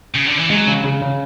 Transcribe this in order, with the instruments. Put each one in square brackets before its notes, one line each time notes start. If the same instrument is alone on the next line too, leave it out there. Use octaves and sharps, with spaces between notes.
[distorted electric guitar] C#3
D3
E3
[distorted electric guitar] F#3 [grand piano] G#3
[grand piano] C#3
C#3
C#3